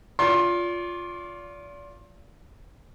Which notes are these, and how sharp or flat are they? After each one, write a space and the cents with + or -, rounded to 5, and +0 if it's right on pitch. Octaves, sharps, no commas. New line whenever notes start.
F4 +0 D5 -35 C6 +25